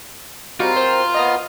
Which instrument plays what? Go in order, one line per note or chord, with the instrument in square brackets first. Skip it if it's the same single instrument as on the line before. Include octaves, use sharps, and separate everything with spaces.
[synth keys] G3 D#4 F#4 [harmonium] C4 A#4 [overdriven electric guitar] F4
[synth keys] C5
[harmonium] B3 [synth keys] D#5 A#5 D#6